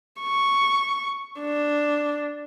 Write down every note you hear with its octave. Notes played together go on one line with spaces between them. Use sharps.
C#6
D4